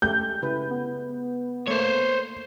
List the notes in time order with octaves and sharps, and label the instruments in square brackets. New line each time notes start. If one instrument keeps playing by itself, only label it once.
[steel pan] G#3 A3 G4 [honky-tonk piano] G6
[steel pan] C#3 B4 [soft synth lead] E4
[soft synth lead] B3
[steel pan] A3 A#3 [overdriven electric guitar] C5 C#5